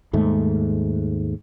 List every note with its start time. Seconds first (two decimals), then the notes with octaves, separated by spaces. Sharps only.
0.13 D#2 G#2 A3